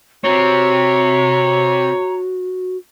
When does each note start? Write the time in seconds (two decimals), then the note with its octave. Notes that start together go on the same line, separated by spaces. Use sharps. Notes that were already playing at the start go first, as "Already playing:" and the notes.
0.24 C3 C4 F#4 C#5 A#5